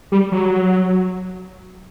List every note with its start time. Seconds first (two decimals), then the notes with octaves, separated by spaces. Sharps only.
0.12 G3
0.32 F#3